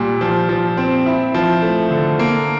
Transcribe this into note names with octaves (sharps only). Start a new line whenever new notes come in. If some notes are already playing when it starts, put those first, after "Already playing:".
Already playing: A#2 G3
F3
F3
C4
E4
F3
A3
D3
A#3